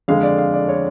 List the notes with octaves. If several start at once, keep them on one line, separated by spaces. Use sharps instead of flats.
F2 D3 G#3 F5
D5
F5
D5
C#5